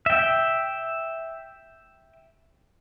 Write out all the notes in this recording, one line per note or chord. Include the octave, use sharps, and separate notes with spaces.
E5 G5